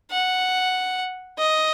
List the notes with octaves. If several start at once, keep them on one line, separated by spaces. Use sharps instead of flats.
F#5
D#5